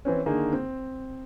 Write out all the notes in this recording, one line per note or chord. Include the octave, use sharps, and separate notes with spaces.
E3 C4 C#4
D3 D#3 A#3 D#4 G#4
C4